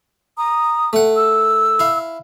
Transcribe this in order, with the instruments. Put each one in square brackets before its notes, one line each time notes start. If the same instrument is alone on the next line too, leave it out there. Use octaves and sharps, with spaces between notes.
[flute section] A#5 D#6
[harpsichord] A3 F#5
[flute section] E6
[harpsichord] E4 F5